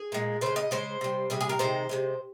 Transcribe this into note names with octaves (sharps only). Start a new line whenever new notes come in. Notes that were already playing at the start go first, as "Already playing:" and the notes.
Already playing: G#4
A#2 G#3
C#3 G#3 C5
D#5
C#3 G#3 C5
C3 G3
C3 G3 G#4
G#4
A#4
C3 D#3 G#3 C5
C3 D#3 G#3